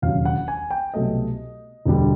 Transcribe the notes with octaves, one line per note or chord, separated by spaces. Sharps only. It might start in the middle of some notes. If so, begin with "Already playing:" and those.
E1 D#2 C#3 F#3 F5
F#5
G#5
G5
C2 B2 F#3 A3 D#5
E1 D2 D3 G3